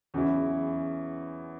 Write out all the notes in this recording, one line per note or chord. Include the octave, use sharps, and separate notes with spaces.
E2 C#3 F#3 C#4 E4